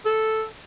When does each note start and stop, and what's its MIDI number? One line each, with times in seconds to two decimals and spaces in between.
0.05 0.45 69